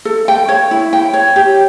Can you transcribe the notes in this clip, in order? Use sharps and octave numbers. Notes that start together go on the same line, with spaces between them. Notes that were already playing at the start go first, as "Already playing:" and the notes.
A4
G5
C#5
E4
G5
C#5
G4